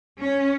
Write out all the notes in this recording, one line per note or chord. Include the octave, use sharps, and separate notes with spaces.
C#4